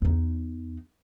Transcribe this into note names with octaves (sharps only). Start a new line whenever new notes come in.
E2 D#4